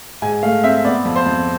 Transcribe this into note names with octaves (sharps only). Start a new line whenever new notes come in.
G#2 G#5
A3 F5
C4 E5
B3 D5
F2
C5
F2